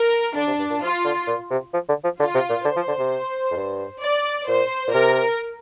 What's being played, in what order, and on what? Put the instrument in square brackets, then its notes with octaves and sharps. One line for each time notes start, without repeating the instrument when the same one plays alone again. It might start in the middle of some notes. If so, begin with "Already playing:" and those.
Already playing: [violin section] A#4
[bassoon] D3 [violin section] D4
[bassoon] C3
G2
A#2
[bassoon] F3 [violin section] F4
[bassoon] D3
A#2
C3
F3
D3
F3
[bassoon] D3 [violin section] F4
[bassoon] C3
A#2
[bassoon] D3 [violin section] C5
[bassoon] F3
D3
C3
F2
G2
[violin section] D5
[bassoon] A#2 [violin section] C5
[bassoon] A#2
[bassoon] C3 [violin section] A#4